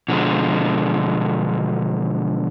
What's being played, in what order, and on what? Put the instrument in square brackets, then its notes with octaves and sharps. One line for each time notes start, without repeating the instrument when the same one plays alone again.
[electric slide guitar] B2 D3 F3 G#3